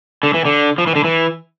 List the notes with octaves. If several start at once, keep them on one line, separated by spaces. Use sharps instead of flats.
D3
E3
D3
F3
E3
D3
E3